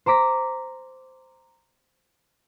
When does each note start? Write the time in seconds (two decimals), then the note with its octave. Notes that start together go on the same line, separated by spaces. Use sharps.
0.06 C5 A#5 D6 B6